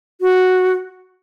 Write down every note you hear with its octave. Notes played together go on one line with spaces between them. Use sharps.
F#4